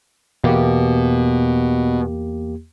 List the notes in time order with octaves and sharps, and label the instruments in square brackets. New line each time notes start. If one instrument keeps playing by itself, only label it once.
[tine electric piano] E2 A#3 G4 [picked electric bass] B2